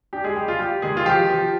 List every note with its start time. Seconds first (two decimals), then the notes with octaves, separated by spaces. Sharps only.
0.13 D4 G4
0.24 G#3 G#4
0.36 G3 G4
0.48 F4
0.59 G3 G4
0.82 D#3 G#3 G#4
0.97 F4
1.06 F3 G4
1.29 F3